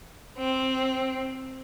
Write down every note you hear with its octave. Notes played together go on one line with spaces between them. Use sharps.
C4